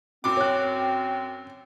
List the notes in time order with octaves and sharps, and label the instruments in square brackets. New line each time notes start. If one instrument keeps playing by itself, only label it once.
[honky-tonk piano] F#2 D6 [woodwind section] C4
[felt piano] C#5 F#6